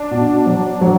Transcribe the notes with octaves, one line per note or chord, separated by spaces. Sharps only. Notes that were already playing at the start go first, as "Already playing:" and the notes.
Already playing: D4
B2
F#3
F#3